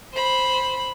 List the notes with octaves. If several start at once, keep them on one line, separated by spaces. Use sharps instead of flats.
C5 B5